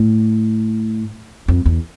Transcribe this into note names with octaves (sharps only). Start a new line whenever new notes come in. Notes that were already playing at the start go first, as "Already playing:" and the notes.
Already playing: A2
F2
E2